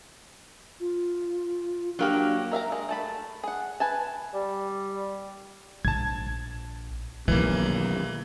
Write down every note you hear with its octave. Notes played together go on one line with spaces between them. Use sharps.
F4
F#3 A#3 D4 G4
A#4 E5 F5 A#5
G#3
A3 A5 B5
G#4 F#5
B4 G#5 A5
G3
A#1 A5 G#6
B2 D#3 E3 F#3 A#3 C4